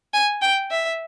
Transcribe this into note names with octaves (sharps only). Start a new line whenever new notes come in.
G#5
G5
E5